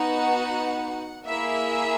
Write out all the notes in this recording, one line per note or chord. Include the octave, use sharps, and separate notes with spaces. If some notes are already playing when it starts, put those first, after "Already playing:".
Already playing: B3 D#4 F#4 F#5
A#3 E4 G#4 E5